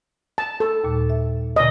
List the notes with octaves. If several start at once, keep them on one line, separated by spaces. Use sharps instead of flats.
A5
A4
D#2 A#2 G3
E5
B2 D3 D5 D#5